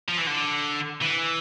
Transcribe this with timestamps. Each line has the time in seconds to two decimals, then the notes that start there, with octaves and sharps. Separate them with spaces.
0.08 F3
0.18 E3
0.27 D3
1.01 E3